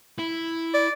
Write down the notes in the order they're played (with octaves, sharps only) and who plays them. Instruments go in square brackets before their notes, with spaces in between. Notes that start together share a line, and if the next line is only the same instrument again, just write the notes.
[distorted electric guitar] E4
[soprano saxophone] D5